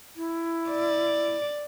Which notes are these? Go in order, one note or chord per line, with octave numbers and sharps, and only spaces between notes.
E4
D5